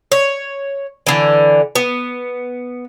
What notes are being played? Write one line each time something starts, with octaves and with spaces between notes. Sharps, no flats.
C#5
D3 E3
B3